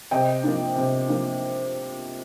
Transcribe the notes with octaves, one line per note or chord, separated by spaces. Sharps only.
C3 D#5 G5
F3 A#3 D4
C3
F3 A#3 D4